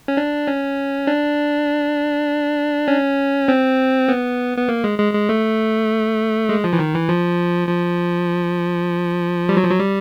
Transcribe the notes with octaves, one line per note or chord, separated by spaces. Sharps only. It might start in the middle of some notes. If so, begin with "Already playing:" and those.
C#4
D4
C#4
D4
C#4
C4
B3
B3
A#3
G#3
G#3
G#3
A3
G#3
F3
E3
D#3
E3
F3
F3
G3
F#3
F3
F#3
G3